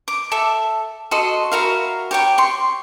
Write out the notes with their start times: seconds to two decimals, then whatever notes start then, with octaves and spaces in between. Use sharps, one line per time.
0.08 D6
0.32 A4 E5
1.11 F#4 A4 D#5 C6
1.52 E4 F#4 A#4 F5
2.11 G4 C#5 G5
2.38 C6 C#6